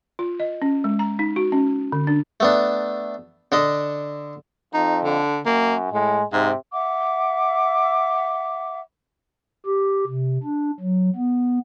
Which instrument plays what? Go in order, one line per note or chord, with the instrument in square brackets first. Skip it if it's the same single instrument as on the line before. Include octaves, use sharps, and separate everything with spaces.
[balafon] F4
D#5
C#4
G#3
A#5
D#4
F#4
C#4
D3
D4
[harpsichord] A3 B3 D4
D3 D4 D#5
[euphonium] F2 [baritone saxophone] D#4
[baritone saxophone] D3
[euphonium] F#2 [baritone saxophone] A#3
[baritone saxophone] A2 [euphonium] G#3
[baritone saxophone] G#2 [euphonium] C3
[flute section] E5 F#5 D6
[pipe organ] G4
C3
D4
F#3
B3